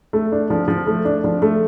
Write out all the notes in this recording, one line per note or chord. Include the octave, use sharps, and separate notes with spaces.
A3
D4
F3
F3
A3
D4
F3
A3